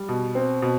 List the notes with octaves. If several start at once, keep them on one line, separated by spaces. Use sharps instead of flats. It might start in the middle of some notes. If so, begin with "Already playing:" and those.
Already playing: G3
B2
C4
B2